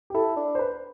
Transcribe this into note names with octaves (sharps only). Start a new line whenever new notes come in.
G4
E4 A4
D4
C5
B4